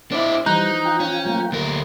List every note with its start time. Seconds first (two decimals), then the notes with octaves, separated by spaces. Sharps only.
0.11 A#1 D4 E4 C5 D6
0.46 E3 F3 G3 D#4 C5 A#5 F#6 G6
0.85 F4 G5
1.00 C#4
1.25 F#3 A3 A#3
1.52 D2 A#4